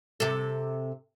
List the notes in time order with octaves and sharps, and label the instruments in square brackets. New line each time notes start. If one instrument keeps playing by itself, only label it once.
[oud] C3 A4